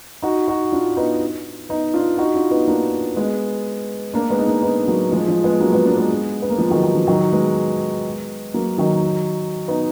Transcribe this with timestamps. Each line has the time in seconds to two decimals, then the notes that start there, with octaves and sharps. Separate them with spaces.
0.22 D#4 F#4
0.48 D#4 F#4
0.72 D4 F4
0.97 B3 D#4
1.69 B3 D#4
1.94 D4 F4
2.18 D#4 F#4
2.34 D4 F4
2.51 B3 D#4
2.68 A#3 D4
3.16 G#3 B3
4.14 A#3 D4
4.30 G#3 B3
4.39 D#4
4.46 A#3 D4
4.62 B3 D#4
4.88 F#3 A#3
5.12 F3 G#3
5.28 F3 G#3
5.44 G#3 B3
5.60 F#3 A#3
5.73 G#3 B3
5.85 A#3 D4
5.97 G#3 B3
6.42 B3
6.50 A#3
6.58 F3 G#3
6.70 D#3 F#3
6.83 D#3
6.95 F3
7.07 D#3 F#3
7.32 G#3 B3
8.54 F#3 A#3
8.78 D#3 F#3
9.68 B3 D#4